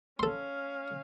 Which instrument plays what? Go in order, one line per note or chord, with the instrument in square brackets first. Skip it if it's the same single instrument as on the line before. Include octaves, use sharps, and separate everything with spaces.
[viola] C#4 F5 [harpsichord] A4 C6